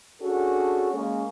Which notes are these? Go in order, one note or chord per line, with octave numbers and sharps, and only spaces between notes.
C#4 D4 F#4 G#4 A4
G#3 A#3 C#4